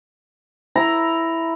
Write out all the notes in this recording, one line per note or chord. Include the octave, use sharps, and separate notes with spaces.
E4 A#5